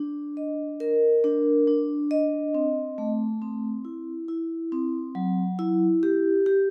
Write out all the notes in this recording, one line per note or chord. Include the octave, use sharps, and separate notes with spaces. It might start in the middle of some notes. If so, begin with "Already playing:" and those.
Already playing: D4
D#5
A#4
D4
D4
D#5
C4
A3
C4
E4
E4
C4
F#3
E4
G4
G4